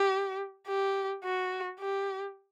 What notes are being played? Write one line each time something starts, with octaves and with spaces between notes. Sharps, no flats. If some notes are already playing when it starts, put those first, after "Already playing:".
Already playing: G4
G4
F#4
G4